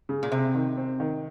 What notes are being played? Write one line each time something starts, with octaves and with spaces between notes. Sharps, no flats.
C#3
A#2
C3 C4
D#3
C4
D#3